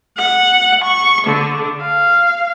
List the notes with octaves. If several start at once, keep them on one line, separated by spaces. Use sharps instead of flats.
F#5
C#6
D3
F5